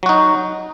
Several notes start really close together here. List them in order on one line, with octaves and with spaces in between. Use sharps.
F#3 F#4 D#4